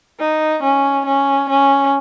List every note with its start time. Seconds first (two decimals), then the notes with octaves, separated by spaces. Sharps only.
0.19 D#4
0.62 C#4
1.06 C#4
1.49 C#4